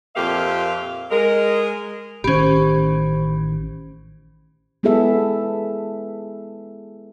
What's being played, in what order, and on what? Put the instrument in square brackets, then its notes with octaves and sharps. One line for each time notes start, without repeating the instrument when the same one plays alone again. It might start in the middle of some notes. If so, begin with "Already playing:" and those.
[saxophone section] F2 A#2 A#3 G4 E5 F5
G#3 A#4
[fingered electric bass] A1 D#3 [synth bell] C#4 G4 [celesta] C5 B5
[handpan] G#3 B3 E4 G#4 A4 E5